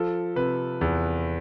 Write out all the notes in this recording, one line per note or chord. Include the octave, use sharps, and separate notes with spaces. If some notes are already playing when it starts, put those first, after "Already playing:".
Already playing: F3 A4
C3 B4
E2